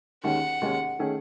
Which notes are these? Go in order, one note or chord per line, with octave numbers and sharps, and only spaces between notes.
D#2 D#3 G#3 C#4 F#5
D#2 D#3 G#3 C#4
D#3 A3 C#4 G#4